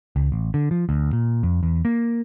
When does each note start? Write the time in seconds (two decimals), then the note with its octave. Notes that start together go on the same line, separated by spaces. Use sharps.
0.16 C#2
0.32 A1
0.54 D3
0.71 F3
0.89 D2
1.13 A#2
1.43 F2
1.63 E2
1.85 A#3